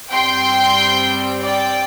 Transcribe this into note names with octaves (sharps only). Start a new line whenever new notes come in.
G2 G3 C4 G5 C6
D5 G5